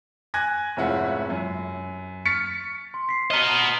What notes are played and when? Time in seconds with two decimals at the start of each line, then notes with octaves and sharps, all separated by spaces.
0.34 G#5 F#6 G#6 A#6
0.77 F1 G#2 C#4 E4 F4 F#5
1.30 F#2
2.25 C#6 F6 A6 B6 C#7
2.94 C6
3.09 B6 C7
3.31 B3 D#5 A#5 F6 E7